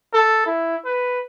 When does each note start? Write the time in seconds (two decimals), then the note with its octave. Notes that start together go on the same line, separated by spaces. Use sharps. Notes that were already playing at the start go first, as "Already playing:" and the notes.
0.14 A4
0.46 E4
0.85 B4